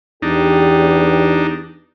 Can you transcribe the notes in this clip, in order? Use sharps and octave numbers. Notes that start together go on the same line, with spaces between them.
E2 D4 D#4 G4